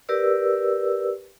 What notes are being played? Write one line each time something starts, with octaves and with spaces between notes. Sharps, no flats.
G4 A#4 B4 D5 E6